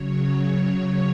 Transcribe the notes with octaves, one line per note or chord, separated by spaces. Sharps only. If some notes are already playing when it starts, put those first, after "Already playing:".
Already playing: C#3 F#3 C#5
C#5
C#3 F#3 C#5